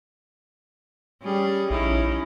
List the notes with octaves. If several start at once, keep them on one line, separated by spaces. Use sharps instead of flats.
G3 C#4 G#4
A#1 C#4 D#4 E4